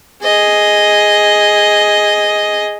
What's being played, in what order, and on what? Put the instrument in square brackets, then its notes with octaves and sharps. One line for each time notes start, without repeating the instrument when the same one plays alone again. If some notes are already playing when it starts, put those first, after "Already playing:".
[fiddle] G#4 D#5